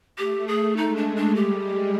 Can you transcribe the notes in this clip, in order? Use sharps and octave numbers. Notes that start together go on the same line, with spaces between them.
A3 G4
G#4
G#3 D#4
D4
D4
G3 G4
G#3